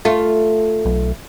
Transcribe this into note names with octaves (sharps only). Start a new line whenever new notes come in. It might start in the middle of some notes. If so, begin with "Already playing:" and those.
A3 F4
B1